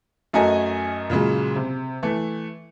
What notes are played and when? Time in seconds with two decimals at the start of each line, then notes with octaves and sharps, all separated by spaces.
0.33 F#2 A3 F#4 A#4 D#5 G#5
1.10 A#2 C#3 F#3 G#3
1.56 C3
2.03 E3 A3